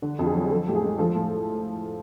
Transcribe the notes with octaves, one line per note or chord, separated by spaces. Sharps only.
D3
F2
G#4
F#3
G#4
F3 A4
A2 G4
G#4
G#3
F3 A4
A2